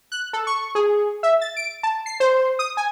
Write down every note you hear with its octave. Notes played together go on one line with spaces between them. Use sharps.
F#6
A4
C#6
G#4
E5
A6
D7
A5
C7
C5
D#6
G#5